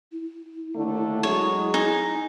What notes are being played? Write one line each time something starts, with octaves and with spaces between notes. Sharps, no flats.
E4
D#2 D3 A3
F#3 G#3 G#4 C#5
D#4 G#5